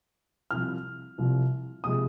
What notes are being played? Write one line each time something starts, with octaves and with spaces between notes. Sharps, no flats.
C2 C3 F3 F6
C2 C3 F3
C3 F3 G#3 D#6